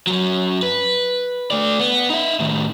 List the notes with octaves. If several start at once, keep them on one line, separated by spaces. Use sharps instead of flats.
F#2 F#3
B4
A3 D5
B3
D#4 E5
A2 D#3